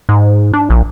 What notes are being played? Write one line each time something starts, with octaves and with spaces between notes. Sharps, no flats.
G#2
D4
A#1